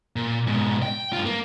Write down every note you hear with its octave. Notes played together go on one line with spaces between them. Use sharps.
A#2
G#2 B2
G5
G2 F4
A#3